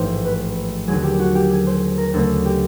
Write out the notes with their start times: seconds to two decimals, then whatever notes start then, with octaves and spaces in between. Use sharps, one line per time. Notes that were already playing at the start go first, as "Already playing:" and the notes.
Already playing: A1 G#2 F3 A3 C5
0.25 B4
0.87 D#2 D3 F#3 G#4
1.04 G4
1.19 F#4
1.35 G4
1.51 G#4
1.67 C5
1.98 A#4
2.14 D2 C#3 F#3 A3 A4
2.46 G4